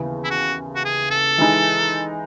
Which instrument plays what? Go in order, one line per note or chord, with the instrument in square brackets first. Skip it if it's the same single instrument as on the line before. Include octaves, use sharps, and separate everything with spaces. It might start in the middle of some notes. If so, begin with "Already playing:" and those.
Already playing: [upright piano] D#2 C#3 E3 B3
[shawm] E4
F#4
F#4
G#4
A4
[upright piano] E3 G#3 D#4